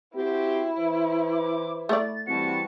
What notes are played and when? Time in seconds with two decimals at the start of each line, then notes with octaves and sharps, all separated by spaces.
0.15 C4 E4 F#4 G4
0.77 E3 B4 C5
1.32 D6
1.89 A3 D5 A6
2.27 E3 G3 C4 F#4 A5 C#7